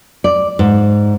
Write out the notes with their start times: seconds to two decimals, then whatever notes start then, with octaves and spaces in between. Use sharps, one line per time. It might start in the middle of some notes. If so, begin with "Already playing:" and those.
0.24 D5
0.59 G#2